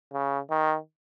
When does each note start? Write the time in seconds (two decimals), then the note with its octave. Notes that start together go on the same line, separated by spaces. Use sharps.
0.13 C#3
0.50 D#3